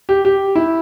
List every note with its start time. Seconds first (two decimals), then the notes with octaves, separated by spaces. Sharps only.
0.09 G4
0.25 G4
0.56 E4